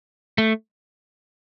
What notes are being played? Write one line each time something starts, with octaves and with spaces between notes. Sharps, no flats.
A3